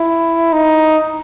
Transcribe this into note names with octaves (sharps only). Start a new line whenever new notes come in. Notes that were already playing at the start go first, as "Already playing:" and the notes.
Already playing: E4
D#4